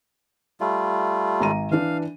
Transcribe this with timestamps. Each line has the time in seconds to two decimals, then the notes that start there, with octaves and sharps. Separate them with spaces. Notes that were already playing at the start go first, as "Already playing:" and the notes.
0.60 G3 A3 F4
1.40 G#1 A#5 D#7
1.71 E3 D4 F5